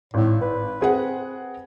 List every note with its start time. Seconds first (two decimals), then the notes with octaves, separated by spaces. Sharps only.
0.14 G#1 A2
0.42 B4
0.81 C4 G#4 F#5